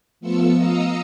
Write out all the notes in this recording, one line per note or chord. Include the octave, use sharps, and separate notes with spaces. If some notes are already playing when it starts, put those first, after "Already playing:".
F3 A3 B3 F4 E6 C#7
D#5 F5 A#5 D#6 E6 C#7